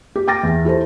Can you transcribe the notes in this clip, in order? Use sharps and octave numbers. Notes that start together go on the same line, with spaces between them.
G4
G5 D6 A6 A#6
E2
E4 G4 A4 C5